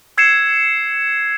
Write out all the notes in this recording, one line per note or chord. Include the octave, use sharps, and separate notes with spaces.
E6 G#6 C7 C#7 E7